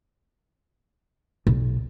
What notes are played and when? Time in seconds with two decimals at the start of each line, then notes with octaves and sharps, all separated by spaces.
1.47 B1